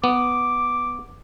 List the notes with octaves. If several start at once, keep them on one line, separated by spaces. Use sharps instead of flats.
B3 D6